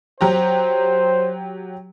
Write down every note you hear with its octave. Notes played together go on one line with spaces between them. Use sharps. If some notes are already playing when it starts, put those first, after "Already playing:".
F#3 G4 C5 A#5